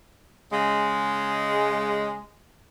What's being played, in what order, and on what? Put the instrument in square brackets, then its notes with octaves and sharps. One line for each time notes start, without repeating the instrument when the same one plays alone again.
[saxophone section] C#3 G#3